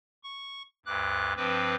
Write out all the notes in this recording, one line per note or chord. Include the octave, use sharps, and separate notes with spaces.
C#6
D2 G2 D6 F#6
G2 F3 C4 B4 D6